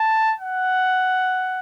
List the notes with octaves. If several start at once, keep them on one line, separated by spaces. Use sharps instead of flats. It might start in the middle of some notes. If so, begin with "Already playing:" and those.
Already playing: A5
F#5